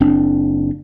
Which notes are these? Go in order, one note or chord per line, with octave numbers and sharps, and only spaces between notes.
F#1 C4 D4